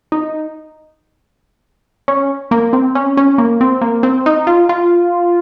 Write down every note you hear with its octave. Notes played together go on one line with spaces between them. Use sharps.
D#4
C#4
A#3
C4
C#4
C#4
A#3
C4
A#3
C4
D#4
F4
F4